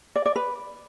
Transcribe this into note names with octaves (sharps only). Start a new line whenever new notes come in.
D5
D5
B4